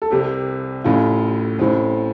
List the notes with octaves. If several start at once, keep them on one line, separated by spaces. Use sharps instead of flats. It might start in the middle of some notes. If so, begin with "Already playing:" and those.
A4
C2 C3 G4
A1 A2 F4
A1 A2 C4